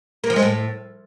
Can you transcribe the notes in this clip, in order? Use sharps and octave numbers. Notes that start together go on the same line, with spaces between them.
A#3
F3
G#3
A2